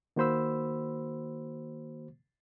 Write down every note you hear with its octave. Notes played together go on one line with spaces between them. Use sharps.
D#3 A#3 F#4 C5 B5 E6